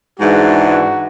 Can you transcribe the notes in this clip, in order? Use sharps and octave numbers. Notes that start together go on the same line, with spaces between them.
G#2 E3 G#3 D4 F#4